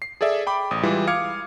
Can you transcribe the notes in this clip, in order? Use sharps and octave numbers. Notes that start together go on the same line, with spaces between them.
C7
G#4 A4 D5 E5
G5 B5 D6
A1 D#6
E3 G3 G#3 E4 F4
F5 D6 F6 G#6 C#7